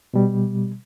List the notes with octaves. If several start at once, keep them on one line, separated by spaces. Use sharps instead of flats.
B2 G3